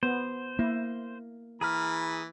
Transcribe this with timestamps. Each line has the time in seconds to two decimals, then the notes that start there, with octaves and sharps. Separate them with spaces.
0.03 B3 C5
0.59 A#3 E4
1.61 E3 G#4 A#5 B5 F6